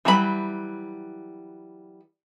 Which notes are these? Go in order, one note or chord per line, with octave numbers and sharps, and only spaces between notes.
E3 F#3 G3 G#4 B5